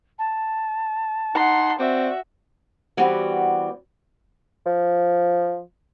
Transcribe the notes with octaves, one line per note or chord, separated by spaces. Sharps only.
A5
D#4 F#5 C6
C4 F#4 D5 E5
E3 G3 B3 C4 F#4 G4
F3